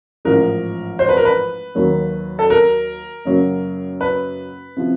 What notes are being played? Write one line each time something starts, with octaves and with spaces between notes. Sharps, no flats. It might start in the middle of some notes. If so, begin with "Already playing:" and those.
A1 G#2 F3 G#3 A#4
C5
B4
A#4
B4
D#2 D#3 F#3 A#3
A4
A#4
F#2 C#3 F#3 A#3
B4
C3 F3